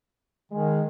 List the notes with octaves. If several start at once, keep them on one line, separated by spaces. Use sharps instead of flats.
D#3 G#3